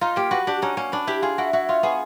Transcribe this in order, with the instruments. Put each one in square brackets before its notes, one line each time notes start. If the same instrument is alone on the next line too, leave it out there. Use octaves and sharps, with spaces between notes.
[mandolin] D#4 [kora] F4
[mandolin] A#3 [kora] G4
[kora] F#4 [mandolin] B4
[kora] D4 [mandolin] G4
[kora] C#4 [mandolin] D#4
[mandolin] A#3 [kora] C#4
[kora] D4 [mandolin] B4
[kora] E4 [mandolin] G4
[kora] F4 [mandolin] G#4
[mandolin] E4 [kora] F#4
[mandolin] E4 [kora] F#4
[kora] F4 [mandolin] C#5
[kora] B3 [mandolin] G#4